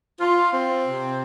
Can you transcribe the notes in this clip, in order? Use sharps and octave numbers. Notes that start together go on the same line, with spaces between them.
F4
C4
C3